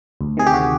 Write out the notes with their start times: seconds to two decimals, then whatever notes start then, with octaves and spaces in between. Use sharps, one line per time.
0.21 D2
0.37 C3 D#3 G#4
0.47 G4
0.53 F#4